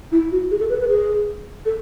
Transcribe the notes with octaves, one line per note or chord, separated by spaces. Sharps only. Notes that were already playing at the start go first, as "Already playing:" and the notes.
E4
F#4
G#4
A4
B4
B4
G#4
A4